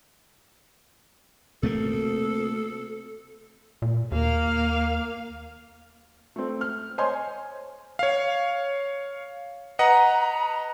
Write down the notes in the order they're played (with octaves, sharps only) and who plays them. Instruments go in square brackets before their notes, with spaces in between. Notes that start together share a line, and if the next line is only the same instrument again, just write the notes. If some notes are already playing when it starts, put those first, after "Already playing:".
[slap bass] C3 A3 A#3 [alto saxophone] A4
[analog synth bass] A#2
[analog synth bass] D#2 [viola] A#3 F5
[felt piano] A3 C4
F6
C5 C#5 D#5 G#5 C6
[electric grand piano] C#5 F5
[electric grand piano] B4 D#5 F#5 [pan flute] A#5